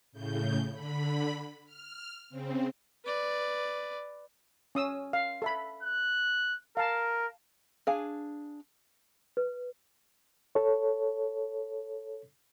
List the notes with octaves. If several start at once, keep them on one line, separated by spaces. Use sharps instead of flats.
A2 C#3 G6
D3 B5
F6
C#3 C4
B4 D5
C#4 D#6 E6
F5
A4 E5 B5
F#6
A#4 F5 A5
D4 G#4 F5 G#5
B4
A4 C#5